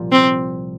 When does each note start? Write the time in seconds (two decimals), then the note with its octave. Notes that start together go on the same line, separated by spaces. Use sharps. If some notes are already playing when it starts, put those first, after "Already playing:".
Already playing: C2 A#2 F3
0.12 C4